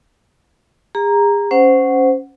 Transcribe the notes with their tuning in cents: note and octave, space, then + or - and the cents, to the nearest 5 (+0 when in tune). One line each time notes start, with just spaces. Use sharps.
G#4 -40 A#5 +0
C#4 +0 C5 -15 F#5 +0